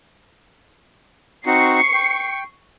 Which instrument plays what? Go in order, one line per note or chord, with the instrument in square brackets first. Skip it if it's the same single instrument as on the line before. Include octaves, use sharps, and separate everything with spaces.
[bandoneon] C4 D#4 F#4 [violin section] C#6 C7 C#7
[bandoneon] G5